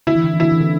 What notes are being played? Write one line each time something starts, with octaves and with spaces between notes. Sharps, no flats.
D3 E4
E3
D3
E3
D3 E4
E3
D3